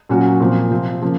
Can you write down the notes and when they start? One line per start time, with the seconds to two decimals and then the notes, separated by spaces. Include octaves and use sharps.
0.09 A#2 F#3 C#4 F#4
0.40 A#2 F3 C4
0.70 C3 F3 C4
1.02 C#3 F3 A#3